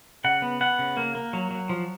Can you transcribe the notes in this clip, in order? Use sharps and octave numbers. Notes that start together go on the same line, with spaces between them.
C#3 F#5
B3
B3 F#5
C#3
A#3
A#3
F#3
F#3
F3